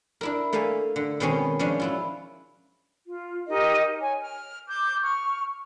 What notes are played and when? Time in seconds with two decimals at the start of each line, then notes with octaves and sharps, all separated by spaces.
0.21 D4 E4 A#4
0.53 A3 A#3 E5 F5 G#5
0.96 D3
1.20 B2 D#3 G#3 C4 C#4
1.59 F3 G#3 C#4 D4
1.80 F#3 E4 F4
3.07 F4
3.48 D#4 G4 A#4 D#5
4.00 C#5 G#5
4.20 F6
4.68 D6 G6
5.02 C#6 F6